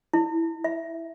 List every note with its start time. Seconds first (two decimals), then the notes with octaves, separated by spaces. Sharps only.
0.13 E4
0.64 E5